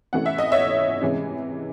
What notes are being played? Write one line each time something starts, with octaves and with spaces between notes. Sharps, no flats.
C3 E3 A3 C#4 F#5
E5
D#5
C#5 E5
C3 E3 G#3 C#4